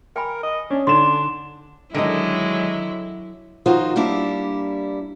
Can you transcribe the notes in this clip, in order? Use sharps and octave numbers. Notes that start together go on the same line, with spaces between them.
A#4 G5 G#5 B5
D#5
C#4 D4
D3 D4 D#4 C6 E7
D3 D#3 F#3 G#3 E4 D#5
D#3 F3 D#4 F4 F#4 C5
G3 A#3 D4 E4